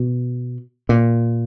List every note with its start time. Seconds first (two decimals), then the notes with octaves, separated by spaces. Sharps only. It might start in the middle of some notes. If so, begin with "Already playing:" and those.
Already playing: B2
0.89 A#2